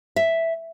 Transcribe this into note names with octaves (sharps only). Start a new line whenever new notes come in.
E5